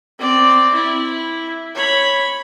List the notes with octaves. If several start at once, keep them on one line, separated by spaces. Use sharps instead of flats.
C4 D5
E4
C#5 B5